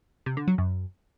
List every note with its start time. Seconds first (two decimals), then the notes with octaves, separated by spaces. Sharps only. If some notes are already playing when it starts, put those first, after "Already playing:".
0.26 C3
0.37 D3
0.48 F#3
0.58 F#2